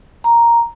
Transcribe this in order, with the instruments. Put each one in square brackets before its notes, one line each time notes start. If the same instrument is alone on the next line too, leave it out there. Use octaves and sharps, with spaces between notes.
[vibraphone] A#5